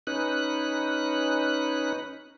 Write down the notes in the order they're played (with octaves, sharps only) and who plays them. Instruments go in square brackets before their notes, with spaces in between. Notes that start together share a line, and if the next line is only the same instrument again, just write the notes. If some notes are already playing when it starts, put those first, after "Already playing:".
[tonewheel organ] C#4 D#4 B4 F#6